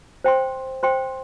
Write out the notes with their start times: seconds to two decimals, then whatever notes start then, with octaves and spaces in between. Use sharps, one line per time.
0.24 C5 G5 C6
0.83 C5 G5 C6